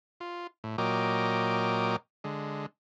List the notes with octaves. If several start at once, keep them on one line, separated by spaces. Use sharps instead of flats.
F4
A2
A#2 F#3 A#4 D#5 G5 D6
D3 G#3